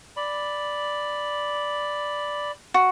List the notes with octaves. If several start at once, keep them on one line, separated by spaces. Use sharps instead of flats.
D5 B5
F#4